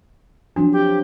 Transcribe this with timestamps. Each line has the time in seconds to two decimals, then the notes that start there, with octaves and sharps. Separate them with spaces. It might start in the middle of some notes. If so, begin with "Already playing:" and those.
0.56 F3 F#3 C4 D4 F#4
0.72 G4